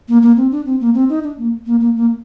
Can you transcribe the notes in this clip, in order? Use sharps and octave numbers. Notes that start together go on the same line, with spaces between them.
A#3
A#3
C4
D4
C4
A#3
C4
D#4
D4
A#3
A#3
A#3
A#3